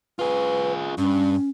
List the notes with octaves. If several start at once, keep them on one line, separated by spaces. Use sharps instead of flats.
F4 G#4 B4
G2 C#4